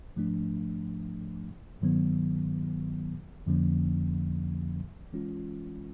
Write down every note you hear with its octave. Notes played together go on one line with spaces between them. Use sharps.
G#2 F3 A3 D4
G2 D#3 F#3 B3
F2 D3 F3 A#3 C#4
E3 G#3 C#4 F4